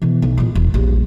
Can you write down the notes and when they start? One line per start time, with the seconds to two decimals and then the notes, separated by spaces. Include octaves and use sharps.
0.02 B2 E3
0.22 B1
0.37 A#2 G#3
0.55 E1
0.74 A#1 G3